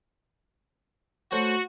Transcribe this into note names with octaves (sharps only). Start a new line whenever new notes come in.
A3 F#4 C5 C#5